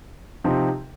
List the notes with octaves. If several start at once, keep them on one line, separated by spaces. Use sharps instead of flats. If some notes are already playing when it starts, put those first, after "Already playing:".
C3 F3 C4 D#4